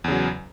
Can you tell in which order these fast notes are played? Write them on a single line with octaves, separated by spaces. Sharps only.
E2 C#3 F#3